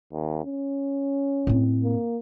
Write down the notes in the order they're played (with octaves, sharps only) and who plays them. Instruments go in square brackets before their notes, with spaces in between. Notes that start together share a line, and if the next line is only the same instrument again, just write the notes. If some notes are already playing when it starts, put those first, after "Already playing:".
[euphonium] D#2
C#4
[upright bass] A2 C4
[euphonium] A#3